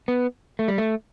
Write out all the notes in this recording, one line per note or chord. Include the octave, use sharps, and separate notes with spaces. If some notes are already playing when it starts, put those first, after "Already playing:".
B3
A3
G3
A3